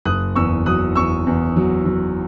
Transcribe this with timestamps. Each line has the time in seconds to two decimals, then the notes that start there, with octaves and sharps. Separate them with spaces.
0.05 F#1 D#6 F#6
0.35 E2 C#6 E6
0.66 F#3 D#6 F#6
0.96 E2 C#6 E6
1.27 E2
1.56 F#3
1.86 F#3